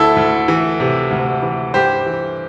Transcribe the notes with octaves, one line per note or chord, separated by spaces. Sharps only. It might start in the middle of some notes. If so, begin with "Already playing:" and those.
Already playing: D2 E4 A4
D2
E3
C3
D2
E3
G2 G4 C5
E3